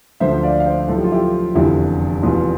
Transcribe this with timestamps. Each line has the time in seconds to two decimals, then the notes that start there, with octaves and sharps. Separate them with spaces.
0.20 D2 D3 F3 C5 E5
0.43 D5 F5
0.60 F5
0.66 C5 E5
0.88 B1 A2 F3 A4
0.96 G4
1.04 F4
1.12 E4 G4
1.55 F1 E2 D3 G3 E4
2.22 F1 E2 B2 G3 F4